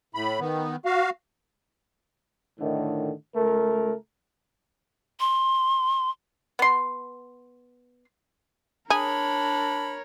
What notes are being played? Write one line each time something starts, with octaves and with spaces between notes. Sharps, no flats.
A2 B5
D#3 B3
F#4 F5
A2 D3 D#3
C#2 A3 A#4
C6
B3 C6
D4 G#4 A#4 C#5 B5